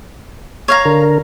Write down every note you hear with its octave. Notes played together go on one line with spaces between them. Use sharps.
C#5 F5 A#5
D3 A#4